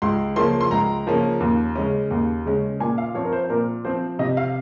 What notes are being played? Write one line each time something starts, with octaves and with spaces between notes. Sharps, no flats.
C#2 C6
C#3 F3 A#3 C#4 C6
C6
C#2 A#5
C#3 F3 A#3 C#4
D#2
C#3 G#3 C#4
D#2
C#3 G#3 C#4
A#2 G#5
F5
F3 C4 C#5
A#4
C5
A#2 A#4
F3 C4 C5
C3 D#5
F5